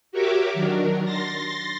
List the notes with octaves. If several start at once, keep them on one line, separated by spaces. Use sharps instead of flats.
F#4 G4 A#4 C#5 E5 D6
D#3 F#3 D4 A#4
C6 A6 A#6